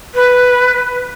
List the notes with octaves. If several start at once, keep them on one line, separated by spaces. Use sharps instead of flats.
B4